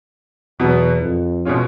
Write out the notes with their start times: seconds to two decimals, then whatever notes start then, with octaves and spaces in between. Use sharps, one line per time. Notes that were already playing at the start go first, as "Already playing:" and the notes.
0.60 E2 B2 F#3 B3
1.02 F2
1.45 B2 G#3 C#4 F4